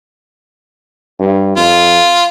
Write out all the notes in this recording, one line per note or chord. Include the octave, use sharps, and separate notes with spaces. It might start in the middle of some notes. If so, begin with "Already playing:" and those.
G2
F2 F4